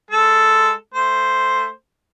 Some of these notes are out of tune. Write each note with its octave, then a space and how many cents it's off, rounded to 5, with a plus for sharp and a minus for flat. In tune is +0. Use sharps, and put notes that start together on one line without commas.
G#3 -5 A4 +0
A3 +10 C5 +0